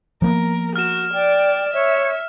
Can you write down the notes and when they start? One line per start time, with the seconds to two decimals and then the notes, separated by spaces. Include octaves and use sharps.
0.22 F3 A#3 B3 A#4
0.76 F#4 F6 E7
1.14 D5 G5
1.74 C#5 E5